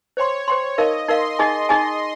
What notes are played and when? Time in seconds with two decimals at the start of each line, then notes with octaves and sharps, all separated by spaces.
0.17 C5 C#5 G5 C6
0.48 C5 G5 C6
0.77 D#4 A#4 D#5 F5
1.08 D#4 A#4 F5 C6
1.39 D#4 G#4 D#5 G#5
1.69 D#4 G#4 D#5 G#5